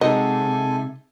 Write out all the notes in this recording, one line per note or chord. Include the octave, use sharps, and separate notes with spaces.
C3 G#3 D#4 F#4 A4 D#5 G#5